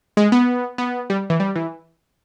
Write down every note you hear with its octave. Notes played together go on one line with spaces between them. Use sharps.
G#3
B3
B3
G3
E3
G3
E3